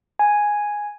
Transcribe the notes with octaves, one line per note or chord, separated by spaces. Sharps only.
G#5